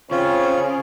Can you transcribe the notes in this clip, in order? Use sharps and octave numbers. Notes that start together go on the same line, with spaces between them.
C#3 C4 F4 C#5